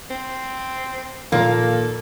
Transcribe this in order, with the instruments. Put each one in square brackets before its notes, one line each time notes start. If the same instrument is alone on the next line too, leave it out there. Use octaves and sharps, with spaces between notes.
[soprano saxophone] C4
[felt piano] A#2 D#3 F3 [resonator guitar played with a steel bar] A#3 [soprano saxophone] A4